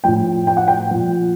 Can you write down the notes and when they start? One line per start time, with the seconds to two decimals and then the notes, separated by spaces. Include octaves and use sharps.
0.04 A2 F3 G5
0.47 G5
0.57 F#5
0.68 G5
0.91 A#2 F3